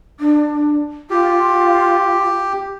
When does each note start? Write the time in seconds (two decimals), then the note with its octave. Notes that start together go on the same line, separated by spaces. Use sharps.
0.20 D4
1.10 F4 G4